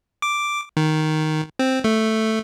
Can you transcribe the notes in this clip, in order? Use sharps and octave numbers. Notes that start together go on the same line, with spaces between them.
D6
D#3
C4
A3